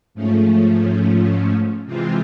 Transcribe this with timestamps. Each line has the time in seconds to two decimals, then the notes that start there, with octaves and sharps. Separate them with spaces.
0.14 G#2 F3 A3 C#4
1.86 C3 E3 G#3 C4 F4